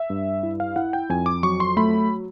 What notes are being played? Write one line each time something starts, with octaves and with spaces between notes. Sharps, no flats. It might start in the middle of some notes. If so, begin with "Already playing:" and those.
Already playing: E5
G2
E4
F5
E4 F#5
G5
F2 G#5
D6
F#3 C#6
C6
A3 B5